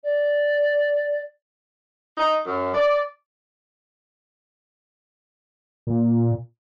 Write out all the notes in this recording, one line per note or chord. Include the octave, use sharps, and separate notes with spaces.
D5
D#4
F#2
D5
A#2